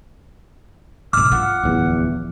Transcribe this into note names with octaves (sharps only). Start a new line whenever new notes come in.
G#2 B2 D6 E6 F6
F3 F#5
D1 E2